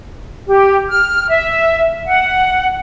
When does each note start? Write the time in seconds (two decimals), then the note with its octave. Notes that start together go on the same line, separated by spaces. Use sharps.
0.48 G4
0.90 F6
1.30 E5
2.07 F#5